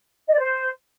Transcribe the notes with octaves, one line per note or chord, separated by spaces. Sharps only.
D#5
D5
C5